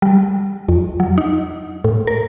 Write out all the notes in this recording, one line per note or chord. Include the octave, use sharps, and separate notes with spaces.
G3
F2
F#3
D#4
A2
A#4